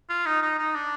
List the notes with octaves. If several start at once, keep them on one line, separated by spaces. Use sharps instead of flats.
F4
D#4
D#4
D#4
D4